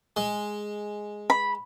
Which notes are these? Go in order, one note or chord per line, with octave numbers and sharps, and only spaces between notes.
G#3
B5